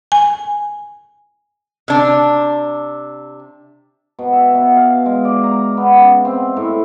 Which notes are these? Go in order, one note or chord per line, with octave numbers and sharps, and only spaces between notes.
G#5
C3 D4
B2
E5
B2
F5
G#3
D5
A#5
B3
C#3
C4
A2